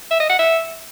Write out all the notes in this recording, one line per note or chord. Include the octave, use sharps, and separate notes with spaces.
E5
D#5
F#5
E5